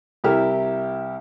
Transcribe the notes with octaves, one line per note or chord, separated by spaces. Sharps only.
C2 E4 G4 A#4 E5 F6